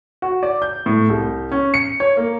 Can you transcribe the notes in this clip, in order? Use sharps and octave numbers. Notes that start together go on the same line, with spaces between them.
F#4
D5
G6
A2
C2
C#4
C#7
C#5
A#3